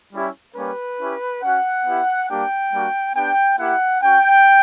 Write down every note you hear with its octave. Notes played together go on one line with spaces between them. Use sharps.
G3 C#4 E4 G4
G3 A#3 C#4 G4 B4
C#4 E4 G4
C#4 F#4 F#5
B3 E4 G4
G3 A#3 D4 G4 G5
G3 A#3 D4 F#4
B3 D4 G4 G5
A#3 E4 G4 F#5
C#4 F#4 G5